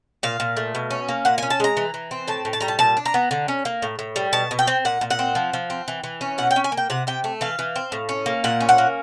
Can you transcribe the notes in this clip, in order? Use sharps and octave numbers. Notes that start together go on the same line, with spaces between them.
A#2 F5
A#2
A3
B2
C#4
A#3
A#2 F#5
G#5
C#4
A5
G#3 A#5
E3
E3
C4
A2 A5
A2
A5
G3 A#5
A5
A#2 A5
D4
A#5
B3
D3
C#4
A#3
A2
A2
G3
B2 A5
B2
G5
C4
A#2 F#5
A#2
F#5
C4
F3
F3
C4
E3
E3
C#4
B2 F#5
G5
C#4
G#5
A#3
G5
C3 F#5
C3 G5
A3
E3 F5
E3
C4
A2
C#4
A#3
A#2 F#5
C#4
F#5
A#3